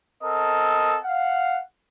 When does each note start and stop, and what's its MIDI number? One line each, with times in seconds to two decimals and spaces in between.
0.23 0.97 60
0.23 0.97 69
0.23 0.97 70
0.23 0.97 75
1.04 1.60 77
1.04 1.60 78